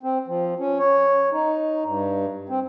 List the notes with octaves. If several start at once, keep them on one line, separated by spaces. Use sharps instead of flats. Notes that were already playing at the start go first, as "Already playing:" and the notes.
C4
F3
C#4
C#5
D#4
G2
C4